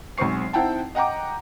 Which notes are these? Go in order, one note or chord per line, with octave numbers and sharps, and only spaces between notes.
B1 G#3 C4 C5 C#6 C7
C4 D#4 E4 F#5 G5 A5
D#5 F#5 G5 A#5 D6